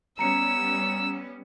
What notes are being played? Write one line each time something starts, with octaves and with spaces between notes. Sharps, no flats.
G3 B3 C#4 A#5 E6 C#7